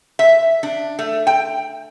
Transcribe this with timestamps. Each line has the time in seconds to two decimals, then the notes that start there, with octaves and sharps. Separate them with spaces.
0.19 E5
0.63 D4
0.99 A3
1.27 G5